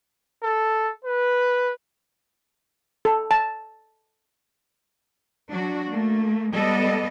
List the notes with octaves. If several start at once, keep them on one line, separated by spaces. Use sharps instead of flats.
A4
B4
A4
A5
F#3 D4 F#4
A3 A#3
G3 G#3 B3 A4 D5 D#5